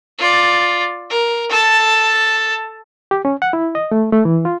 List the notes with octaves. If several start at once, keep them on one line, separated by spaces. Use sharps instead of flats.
F4 D5
A#4
A4 A5
G4
C#4
F#5
E4
D#5
A3
A3
E3
F4